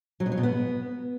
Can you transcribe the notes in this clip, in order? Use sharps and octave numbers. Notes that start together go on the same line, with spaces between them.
F#3
B2
F#3
B2
B3